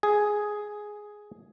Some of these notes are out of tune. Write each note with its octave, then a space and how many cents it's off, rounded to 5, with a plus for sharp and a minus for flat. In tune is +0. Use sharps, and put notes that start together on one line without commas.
G#4 +5